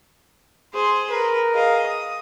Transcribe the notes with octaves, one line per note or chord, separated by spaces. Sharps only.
G#4 C5 C6
A#4 B4
G#4 D#5 F5
D#6